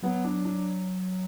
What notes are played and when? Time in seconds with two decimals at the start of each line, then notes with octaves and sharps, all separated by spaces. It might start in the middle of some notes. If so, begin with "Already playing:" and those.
0.03 F#3 B3
0.24 D4
0.45 D4